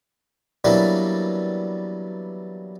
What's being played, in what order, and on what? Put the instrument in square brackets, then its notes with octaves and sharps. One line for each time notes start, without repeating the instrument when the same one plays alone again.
[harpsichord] E3 F#3 G3 A#3 B3 D4